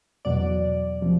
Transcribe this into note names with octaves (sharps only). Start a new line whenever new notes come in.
E2 B2 F#3 D5
C3 F3